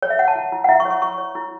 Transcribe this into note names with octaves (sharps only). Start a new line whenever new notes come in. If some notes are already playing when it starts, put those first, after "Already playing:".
C#5
E5
C#5 F#5
A5
E4
E4
F#5
E4 E5
C#6
C#5
C#6
E4 C#6
C#5
E4